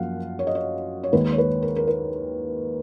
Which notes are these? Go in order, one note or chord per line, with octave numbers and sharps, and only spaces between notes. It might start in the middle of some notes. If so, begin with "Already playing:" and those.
Already playing: F#2 F3 A#3 F4 F5 F#5
C#5
D#5
C#5
C#5
D#2 D#3 G#3 B4
C#5
B4
A#4
A#4
B4